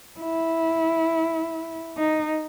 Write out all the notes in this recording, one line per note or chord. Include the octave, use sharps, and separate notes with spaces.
E4
D#4